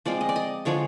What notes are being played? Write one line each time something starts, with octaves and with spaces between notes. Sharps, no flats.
F3 G#3 C4 D5
D#5
D5
D#5
D3 F3 G#3 C#5